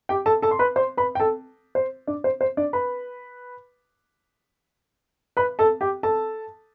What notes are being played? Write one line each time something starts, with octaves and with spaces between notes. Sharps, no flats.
G4 G5
A4 A5
A4 A5
C6
B4 B5
C5 C6
B4 B5
G5
A4 A5
C5
D4 D5
C5
C5
D4 D5
B4 B5
B4 B5
A4 A5
G4 G5
A4 A5